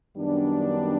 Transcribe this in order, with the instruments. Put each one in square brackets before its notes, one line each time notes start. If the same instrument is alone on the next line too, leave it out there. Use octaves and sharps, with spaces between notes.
[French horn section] F#2 D#3 G3 B3 D4